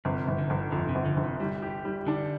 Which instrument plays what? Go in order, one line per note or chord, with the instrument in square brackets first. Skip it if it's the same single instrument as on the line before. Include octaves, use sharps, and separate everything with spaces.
[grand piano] G1 [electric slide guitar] C3
[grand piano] G1
[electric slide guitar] D3
[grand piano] G1
[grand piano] F2 [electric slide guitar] D3
[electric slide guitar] C3
[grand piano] G1
[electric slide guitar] D3
[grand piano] G1
[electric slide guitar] C3
[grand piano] G3
G4
G3
[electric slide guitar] D3 [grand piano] D4